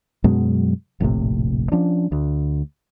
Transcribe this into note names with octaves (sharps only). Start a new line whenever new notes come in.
F#2 B2 F#3 G#3
F1 A#1 A2 C3
F3 C#4 D4
D2